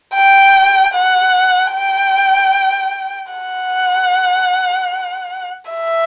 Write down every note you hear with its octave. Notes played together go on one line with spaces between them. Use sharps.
G5
F#5
G5
F#5
E5